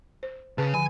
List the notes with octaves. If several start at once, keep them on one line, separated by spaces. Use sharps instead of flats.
C5
C#3 G#4 B4 A5
D3 F3 G#5